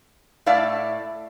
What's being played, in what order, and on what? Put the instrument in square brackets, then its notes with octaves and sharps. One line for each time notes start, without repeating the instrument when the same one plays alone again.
[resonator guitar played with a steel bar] A2 D5 E5 F5